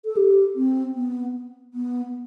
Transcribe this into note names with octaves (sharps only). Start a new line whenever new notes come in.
A4
G4
C4
B3
B3